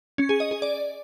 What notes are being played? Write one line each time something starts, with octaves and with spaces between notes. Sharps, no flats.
C#4
G#4
D#5
G#4
D5